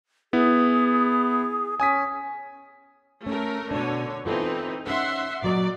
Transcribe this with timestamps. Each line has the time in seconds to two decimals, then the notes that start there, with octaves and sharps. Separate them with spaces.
0.33 B3 E4 G#4
1.80 C#4 G#5 D#6 B6
3.26 A3 C#4 A#4
3.71 B2 D3 D4 C#5
4.25 E3 B3 C4 D#4 F4 A4
4.87 C#4 D#4 E5 F#5 C6
5.42 A#2 F#3 D5 D#5